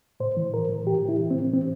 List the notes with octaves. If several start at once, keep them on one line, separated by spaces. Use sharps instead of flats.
A2 C5
E3
A2 A#4
E3
A2 G4
E3
E4
A2
C4
E3
A2 C4